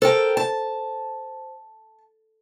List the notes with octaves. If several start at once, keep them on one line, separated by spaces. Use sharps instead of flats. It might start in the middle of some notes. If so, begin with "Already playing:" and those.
A4 A#4 C5 G5
A5